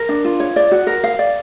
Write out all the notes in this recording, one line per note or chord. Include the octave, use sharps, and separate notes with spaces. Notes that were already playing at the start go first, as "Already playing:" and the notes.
Already playing: A#4
D4
F4
C#5
D5
F#4
A#4
F5
D5